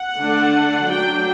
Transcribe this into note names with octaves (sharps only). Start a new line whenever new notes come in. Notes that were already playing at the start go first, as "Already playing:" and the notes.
Already playing: F#5
D3 A3 D4
F#3 A3 D4 G5